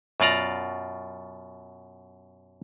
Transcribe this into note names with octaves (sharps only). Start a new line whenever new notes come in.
F#2 B2 F4 D5 A#5